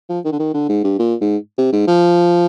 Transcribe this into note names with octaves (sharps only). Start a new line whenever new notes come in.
F3
D#3
D3
D#3
D3
G#2
G2
A#2
G#2
C3
G#2
F3